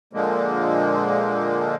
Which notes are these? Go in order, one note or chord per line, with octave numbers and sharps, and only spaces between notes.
A#2 D3 F3 G#3 A#3